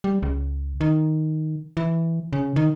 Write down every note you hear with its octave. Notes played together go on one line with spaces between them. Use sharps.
G3
C#2
D#3
E3
C#3
D#3